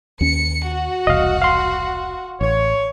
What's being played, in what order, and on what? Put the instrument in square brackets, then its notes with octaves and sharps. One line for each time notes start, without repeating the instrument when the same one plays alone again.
[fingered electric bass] D#2 C#4 [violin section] C#7
[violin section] F#4
[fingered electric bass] E1 C2 [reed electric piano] D#5 F5
[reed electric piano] F5 C6
[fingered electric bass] A1 [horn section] C#5